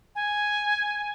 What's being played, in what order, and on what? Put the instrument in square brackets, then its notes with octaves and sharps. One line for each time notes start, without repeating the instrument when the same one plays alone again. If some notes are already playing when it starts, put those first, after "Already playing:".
[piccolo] G#5